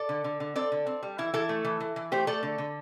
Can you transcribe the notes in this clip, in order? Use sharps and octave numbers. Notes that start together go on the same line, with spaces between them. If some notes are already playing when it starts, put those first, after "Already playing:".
Already playing: A4 D5
D3
D3
D3
C4 A4 D5
D3
C4
G3
E3 E4
E3 E4 A4
A3
E3
E3
E3
A3 G4 C5
A3 A4 D5
D3
D3